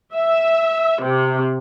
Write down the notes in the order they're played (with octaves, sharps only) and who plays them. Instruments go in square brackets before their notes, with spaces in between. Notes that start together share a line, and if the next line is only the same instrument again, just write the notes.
[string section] E5
C3